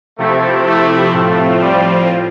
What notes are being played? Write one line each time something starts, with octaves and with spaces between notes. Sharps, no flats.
C3 F3 A3 C4 E4 G4
A3
A2 F3 A3 C4 F4
G3